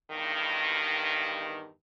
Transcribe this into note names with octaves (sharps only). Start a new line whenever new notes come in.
E2 G2 D#3